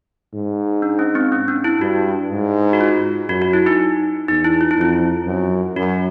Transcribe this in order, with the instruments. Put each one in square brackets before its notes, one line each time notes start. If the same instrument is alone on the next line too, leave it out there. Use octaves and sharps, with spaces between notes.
[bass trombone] G#2
[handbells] D4
C#4
C4
C#4
D4
E4
[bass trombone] G2 [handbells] F#4
[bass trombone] G#2
[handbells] F#4
F4
[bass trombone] F#2 [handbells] F#4
[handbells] F#4
E4
D#4
[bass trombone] E2 [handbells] D#4
[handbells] E4
F4
E4
[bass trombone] F2 [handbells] F4
[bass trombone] F#2
[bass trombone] F#2 [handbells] F#4